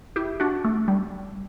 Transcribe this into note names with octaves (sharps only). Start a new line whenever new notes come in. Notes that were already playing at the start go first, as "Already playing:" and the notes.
E4 G4
D4 F#4
A3
G3